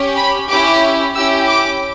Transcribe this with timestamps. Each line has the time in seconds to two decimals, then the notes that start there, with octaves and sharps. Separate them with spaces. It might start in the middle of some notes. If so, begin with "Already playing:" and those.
Already playing: C#4 G4
0.17 B5
0.49 C#4 E4 G4 D6
1.15 C#4 E4 G4 E6
1.47 D6